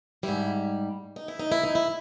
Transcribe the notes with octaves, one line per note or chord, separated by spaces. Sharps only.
G#2 G3 E4
D#4
E4
D#4
E4
D#4
E4